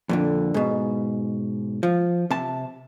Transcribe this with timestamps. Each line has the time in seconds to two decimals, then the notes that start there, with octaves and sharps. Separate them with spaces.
0.09 F2 A#2 D3
0.54 G#2 B2
1.83 F3
2.31 C3 A5